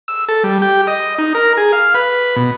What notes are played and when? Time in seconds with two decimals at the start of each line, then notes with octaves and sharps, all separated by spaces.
0.08 E6
0.29 A4
0.44 G3
0.62 G4
0.87 D#5
1.18 D#4
1.35 A#4
1.57 G#4
1.73 F5
1.95 B4
2.36 B2